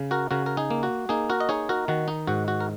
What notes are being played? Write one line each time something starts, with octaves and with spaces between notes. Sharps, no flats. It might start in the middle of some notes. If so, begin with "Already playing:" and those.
Already playing: C#3
F#4 A#4
C#3 F#4 A#4
A#4
D#4 G#4
A#3
F#4
A#3 D#4 G#4
F#4 A#4
D#5
D#4 G#4 C#5
F#4 A#4
D#3 F#4
D#4
G#2 F#4
F#4
A#4